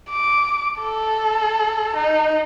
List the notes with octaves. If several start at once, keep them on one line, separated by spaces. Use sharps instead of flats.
D6
A4
D#4